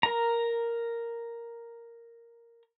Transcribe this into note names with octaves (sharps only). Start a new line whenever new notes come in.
A#4 A#5